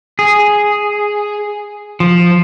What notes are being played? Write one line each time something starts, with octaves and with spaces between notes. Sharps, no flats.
G#4
F3